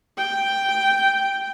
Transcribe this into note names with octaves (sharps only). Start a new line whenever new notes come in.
G5